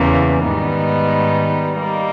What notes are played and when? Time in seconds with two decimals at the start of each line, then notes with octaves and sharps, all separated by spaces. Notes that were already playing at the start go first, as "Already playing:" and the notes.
Already playing: E2 C#3 G3 A#3 C#4
0.44 G#2 D#3 G3 B3 D#4
1.78 G3 A#3 D#4